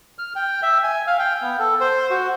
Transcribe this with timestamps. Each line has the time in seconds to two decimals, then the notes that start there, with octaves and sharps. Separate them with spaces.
0.18 F6
0.36 G5
0.63 E5
0.83 G#5
1.07 F5
1.19 G5
1.42 B3
1.59 A4
1.80 C5
2.10 F#4